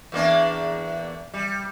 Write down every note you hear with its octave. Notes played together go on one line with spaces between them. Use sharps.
E2 A#3 D4
G3